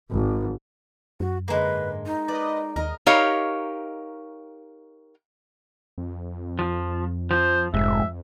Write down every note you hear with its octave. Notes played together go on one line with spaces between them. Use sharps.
G#1
F#2 F#4
G#2 D3 G#3 A#3 B4
D#4
B4 D5 D#5
D#2 A#4 D#5
D#4 G4 A#4 C#5 D#5 F5
F2
F3
F3 C5
F1 G#2 E5